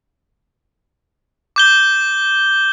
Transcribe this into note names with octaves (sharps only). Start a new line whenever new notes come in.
D6 G6 G7